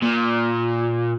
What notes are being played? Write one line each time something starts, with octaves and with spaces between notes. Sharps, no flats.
A#2